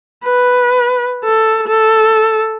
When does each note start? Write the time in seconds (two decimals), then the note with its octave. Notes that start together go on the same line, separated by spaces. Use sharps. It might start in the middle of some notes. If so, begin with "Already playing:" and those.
0.25 B4
1.24 A4
1.68 A4